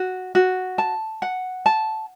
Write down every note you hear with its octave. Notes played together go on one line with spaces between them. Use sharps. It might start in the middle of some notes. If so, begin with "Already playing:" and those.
Already playing: F#4
F#4
A5
F#5
A5